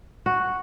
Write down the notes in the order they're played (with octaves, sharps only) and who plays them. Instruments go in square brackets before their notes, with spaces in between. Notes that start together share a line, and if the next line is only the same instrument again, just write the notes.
[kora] F#4